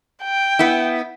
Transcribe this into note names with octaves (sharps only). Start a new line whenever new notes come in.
G5
B3 E4